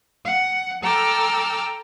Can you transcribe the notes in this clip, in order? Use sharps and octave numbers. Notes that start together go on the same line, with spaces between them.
F#5
A4 G5 A#5 D6 E6 F6